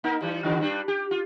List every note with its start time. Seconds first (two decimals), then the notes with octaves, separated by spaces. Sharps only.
0.04 A#3 D#4 A#4
0.21 E3 G3
0.43 D3 D#3 B3
0.60 G2 G3 D4
0.88 G4
1.11 F4